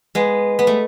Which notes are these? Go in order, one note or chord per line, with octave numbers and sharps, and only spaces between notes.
G#3 B3
B3
A3